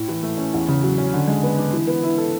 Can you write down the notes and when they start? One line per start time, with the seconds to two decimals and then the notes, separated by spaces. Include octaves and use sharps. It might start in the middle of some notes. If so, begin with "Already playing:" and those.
Already playing: A2
0.08 E3
0.23 A3
0.38 C#4
0.54 E2
0.69 C#3
0.83 F#3
0.98 C#4
1.14 D3
1.27 G#3
1.43 B3
1.59 D4
1.73 E3
1.87 B3
2.03 E4
2.18 A4